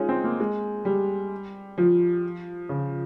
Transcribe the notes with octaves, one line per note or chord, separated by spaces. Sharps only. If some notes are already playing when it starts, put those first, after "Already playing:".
Already playing: G#3 C#4 D#4 F4
C4
A#3
G#3
G3
F3
C#3